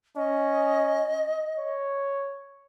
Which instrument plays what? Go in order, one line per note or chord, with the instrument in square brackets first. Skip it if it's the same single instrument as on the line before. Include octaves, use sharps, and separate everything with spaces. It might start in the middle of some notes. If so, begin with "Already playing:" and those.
[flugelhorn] C#4 [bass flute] D#5
[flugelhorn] C#5